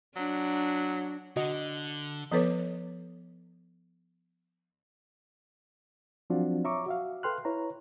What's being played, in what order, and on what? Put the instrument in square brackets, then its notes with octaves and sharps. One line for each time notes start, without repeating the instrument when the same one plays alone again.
[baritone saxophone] F#3 [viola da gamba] D4
[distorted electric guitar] D3 [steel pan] F#4 D#5
[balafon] F3 B3 A4 B4 C#5 D6
[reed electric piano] F3 F#3 C4 D4 F4 F#4
C#5 E5 A#5 C#6 D6
F#4 E5 F5
A4 B4 G5 C6 F6 F#6
E4 B4 C#5 A#5